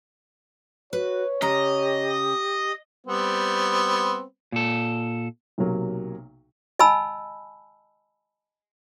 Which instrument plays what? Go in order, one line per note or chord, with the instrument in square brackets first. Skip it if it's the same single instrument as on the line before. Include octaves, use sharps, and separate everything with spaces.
[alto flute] F#4 [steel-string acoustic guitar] B4 [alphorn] C#5
[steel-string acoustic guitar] C#3 A#5 [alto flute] G4 [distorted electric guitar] D#5
[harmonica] G3 B3 C4
[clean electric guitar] A#2 A4
[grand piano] B1 C3 F#3 A#3
[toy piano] D#5 G#5 A5 B5 E6